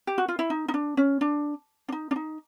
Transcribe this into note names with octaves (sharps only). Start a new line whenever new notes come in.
G4
F#4
F4
E4
D#4
D#4
D4
C#4
D4
D4
D#4
D4
D#4